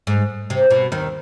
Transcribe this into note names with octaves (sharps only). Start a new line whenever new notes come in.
G#2
C3
B2
D#2 D#3